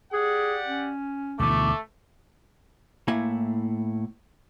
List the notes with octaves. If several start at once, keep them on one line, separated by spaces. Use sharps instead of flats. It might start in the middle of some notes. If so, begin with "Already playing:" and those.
G4 G#4 D5 F#5
C#4
D2 B2 E3 A3 D6
A2 A#3 E4 G#5